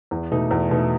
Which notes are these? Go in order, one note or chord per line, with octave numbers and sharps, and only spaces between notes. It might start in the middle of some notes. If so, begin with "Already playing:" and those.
E2
B2 A3 D#4
E2
B2 A3 D#4